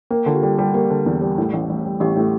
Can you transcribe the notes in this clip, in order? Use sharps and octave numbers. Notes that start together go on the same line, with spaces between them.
A#3 G5
D3 F4
G4
G3 A4
G3
A#3 G4
D3
E2
G3
A2
A1
A1
G3
A1 G4
A2